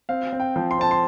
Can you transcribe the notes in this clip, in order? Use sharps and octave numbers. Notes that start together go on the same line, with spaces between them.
C4 F5
C4
G5
F3
C6
C4 A5
C6